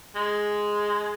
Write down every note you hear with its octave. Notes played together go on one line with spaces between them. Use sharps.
G#3